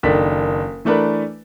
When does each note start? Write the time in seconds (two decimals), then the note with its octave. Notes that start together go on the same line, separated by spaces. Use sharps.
0.03 F#1 D#3 D4 A4 B6
0.85 E3 A3 D4 A#4 B4